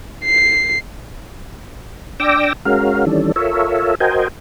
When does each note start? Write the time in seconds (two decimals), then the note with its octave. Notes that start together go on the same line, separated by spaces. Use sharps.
0.25 C7
2.20 D4 D5 G5 D6 E6 A#6
2.65 G#3 C#4 F#4 A#4 F5
3.06 D#3 E3 G3 C#4 D4 A4
3.36 F4 A4 A#4 C#5 E5
4.00 F#4 A#4 C5 D#5 G5 G#5